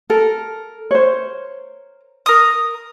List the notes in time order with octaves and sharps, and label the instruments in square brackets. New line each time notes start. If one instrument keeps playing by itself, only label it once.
[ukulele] A4 [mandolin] A#4
[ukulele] C5 C#5
[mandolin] A#4 D#6